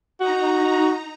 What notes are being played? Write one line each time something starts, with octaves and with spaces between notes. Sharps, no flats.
D#4 F#4 A#5